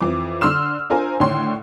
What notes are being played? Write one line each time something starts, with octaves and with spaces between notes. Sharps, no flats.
F2 E3 D6
D3 C6 E6 F6 E7
D4 F4 A#4 C5 G#5
A2 D3 D#3 C#5 G5 C6